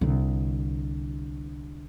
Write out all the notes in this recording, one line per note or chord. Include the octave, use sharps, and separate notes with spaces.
C2 D3